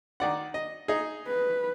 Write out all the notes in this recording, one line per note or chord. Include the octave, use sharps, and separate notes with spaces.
D#3 D5 F#5
D#5
D#4 G#4
B4